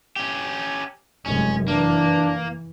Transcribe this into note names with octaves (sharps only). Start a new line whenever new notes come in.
C#4 G4
F1 F#2 G#3 C#4
E3 A#3 D4